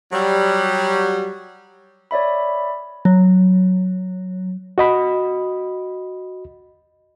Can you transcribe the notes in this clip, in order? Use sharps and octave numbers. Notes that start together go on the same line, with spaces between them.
F#3 G3
C#5 D5 E5 B5
F#3
F#4 D#5 B5